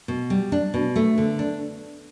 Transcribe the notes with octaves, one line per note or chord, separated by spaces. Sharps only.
B2
G3
D4
B2
A3
D3
D4